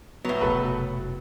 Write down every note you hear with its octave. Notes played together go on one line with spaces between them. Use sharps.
A2 F#3 B3
F1 B2 F#4 A4 B4